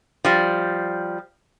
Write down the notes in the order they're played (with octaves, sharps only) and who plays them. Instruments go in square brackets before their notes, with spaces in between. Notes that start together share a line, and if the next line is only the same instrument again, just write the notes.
[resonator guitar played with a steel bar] F3 G3